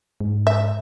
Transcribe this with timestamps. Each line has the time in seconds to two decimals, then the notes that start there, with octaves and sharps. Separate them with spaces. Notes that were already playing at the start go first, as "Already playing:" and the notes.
0.20 G#2
0.47 E5